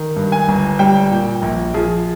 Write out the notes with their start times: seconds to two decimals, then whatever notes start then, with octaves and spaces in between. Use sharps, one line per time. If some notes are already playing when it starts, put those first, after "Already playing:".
Already playing: D#3
0.16 G2
0.32 G#5
0.48 G1
0.79 G3 G5
1.11 A#2
1.42 A#1
1.74 F3 G#4